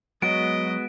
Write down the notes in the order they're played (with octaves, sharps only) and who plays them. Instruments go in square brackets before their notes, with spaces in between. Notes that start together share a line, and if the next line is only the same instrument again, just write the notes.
[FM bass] F#3 [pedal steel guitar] G#3 B3 F#4 [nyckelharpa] D#5 [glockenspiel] D7